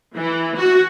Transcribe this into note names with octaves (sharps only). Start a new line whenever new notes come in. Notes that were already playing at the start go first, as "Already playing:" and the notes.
E3
F#4